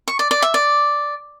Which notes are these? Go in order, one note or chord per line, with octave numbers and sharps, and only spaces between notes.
C#6
D5
D5
E5
D5